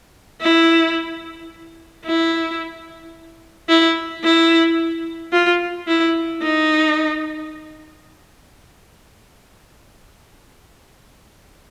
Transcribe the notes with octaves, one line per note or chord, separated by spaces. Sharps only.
E4
E4
E4
E4
F4
E4
D#4